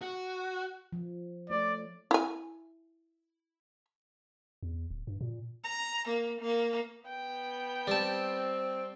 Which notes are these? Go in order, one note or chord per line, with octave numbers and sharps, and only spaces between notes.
F#4
F3
A3 C#5 D5
E4 G#5
E2
D1
G2
A#2
A#5
A#3
A#3
B3 G5
G3 C4 A5